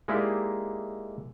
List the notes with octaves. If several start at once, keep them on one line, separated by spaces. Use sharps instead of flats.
G#3 A#3 D#4 E4 G4 D5